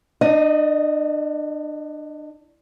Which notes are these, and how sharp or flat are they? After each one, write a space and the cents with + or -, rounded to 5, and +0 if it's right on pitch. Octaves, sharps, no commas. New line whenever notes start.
D4 +30 D#5 +0